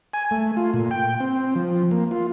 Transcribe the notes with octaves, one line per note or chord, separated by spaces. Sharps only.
G#5
A3
F4
A#2
G5
C4
F3
A#3
F4